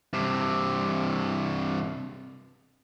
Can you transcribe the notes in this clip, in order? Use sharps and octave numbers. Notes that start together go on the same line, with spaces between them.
G2 C3